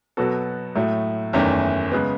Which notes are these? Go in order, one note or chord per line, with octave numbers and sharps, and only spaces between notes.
B2 F#3 B3 F#4 A4
A2 F#3 A3
F#1 E2 D#3 A3 C#4
C#3 G#3 B3